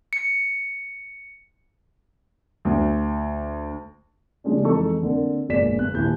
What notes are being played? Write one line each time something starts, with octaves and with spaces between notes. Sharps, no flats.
C#7
D2
C#3 F3 G3 G#3 C#4 D4
F2 E3 G#3 D#4 A4 C#6
D3 A#3 C4
G1 A#2 G#3 D5 B6 E7
G1 F#6
D#1 E4 G6